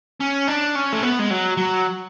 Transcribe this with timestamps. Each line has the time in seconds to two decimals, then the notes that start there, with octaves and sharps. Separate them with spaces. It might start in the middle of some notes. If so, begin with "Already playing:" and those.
0.20 C#4
0.48 D4
0.75 C#4
0.93 A3
1.03 B3
1.19 G#3
1.30 F#3
1.57 F#3